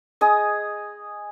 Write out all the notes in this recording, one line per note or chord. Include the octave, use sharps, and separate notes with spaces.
G#4 D#5